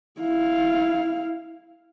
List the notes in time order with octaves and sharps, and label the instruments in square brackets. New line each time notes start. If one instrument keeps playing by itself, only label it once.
[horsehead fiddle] E4 F5